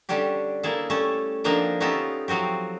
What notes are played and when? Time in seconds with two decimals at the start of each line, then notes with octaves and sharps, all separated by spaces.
0.09 D3 G3 C#4 D4 G4
0.63 A#3 E4 G#4 A4
0.90 G3 A3 C#4 A4
1.44 D3 F3 A#3 C4 D4 D#4
1.80 B3 C#4 D#4 F4 G4 A4
2.28 F3 F#3 C4 F#4 G4